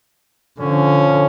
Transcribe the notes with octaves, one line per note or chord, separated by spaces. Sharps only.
D3 F3 C#4